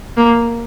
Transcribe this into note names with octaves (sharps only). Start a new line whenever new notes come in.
A#3